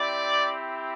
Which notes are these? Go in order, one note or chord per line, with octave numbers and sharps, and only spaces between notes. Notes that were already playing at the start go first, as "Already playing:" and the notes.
Already playing: C4 E4 G4 D5